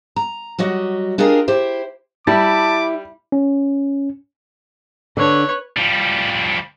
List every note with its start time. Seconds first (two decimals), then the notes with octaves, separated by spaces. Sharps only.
0.16 A#5
0.58 F#3 G3 F#4 D#5
1.18 D4 F4 G4 G#4 A#4 D#5
1.48 E4 G4 C5
2.27 G3 E4 A5 D6
3.32 C#4
5.17 D3 D4 B4 C#5
5.77 F3 G3